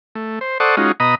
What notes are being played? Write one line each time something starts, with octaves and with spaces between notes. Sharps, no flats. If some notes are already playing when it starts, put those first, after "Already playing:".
A3
C5
A4 C5 D5 F#5 C#6 D#6
G#3 C#4 D#4 F4 F#4
B2 D#5 A#5 B5 D#6